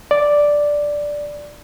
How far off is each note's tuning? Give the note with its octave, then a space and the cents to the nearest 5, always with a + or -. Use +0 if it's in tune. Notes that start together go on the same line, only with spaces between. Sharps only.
D5 +0